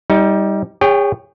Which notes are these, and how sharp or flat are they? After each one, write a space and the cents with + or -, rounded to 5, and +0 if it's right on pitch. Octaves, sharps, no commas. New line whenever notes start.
G3 +0 D#4 +30
G#4 -40 C#5 +0 G5 +0